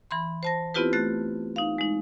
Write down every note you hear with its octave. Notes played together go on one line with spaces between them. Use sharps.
E3 B5 C6
C5 A5 A#6
B3 C4 E4 F4 G4 B4
A3 F#6 A6
D#4 F5
G#3 D#4